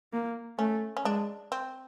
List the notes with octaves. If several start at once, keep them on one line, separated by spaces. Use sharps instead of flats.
A#3
A3 C#4
C#4
G#3 D4
C4